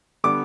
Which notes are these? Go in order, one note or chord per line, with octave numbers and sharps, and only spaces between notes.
D3 G3 B3 D6